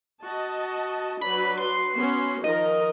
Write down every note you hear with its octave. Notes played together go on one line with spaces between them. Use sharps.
F#4 D#5 A5
F#3 D4 B4 B5
C6
B3 C#4 F#4
D#3 F3 A#4 D#5